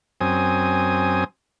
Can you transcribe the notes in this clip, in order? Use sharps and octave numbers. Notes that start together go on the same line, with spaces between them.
F#2 C4 G#5 D#6